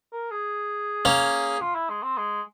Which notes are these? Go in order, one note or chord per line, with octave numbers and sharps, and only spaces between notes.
A#4
G#4
A#3 C#4
F4
E4
G#3
C4
G#3